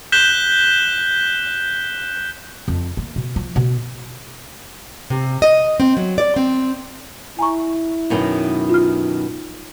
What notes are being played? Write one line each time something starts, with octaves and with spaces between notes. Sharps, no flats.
F#6 G6 B6 E7 G7
F2
A#3
B2
F3
B2
C3
D#5
C4
F#3
D5
C4
E4 G#5 A#5 C#6
F#2 B2 D#3
F4 F6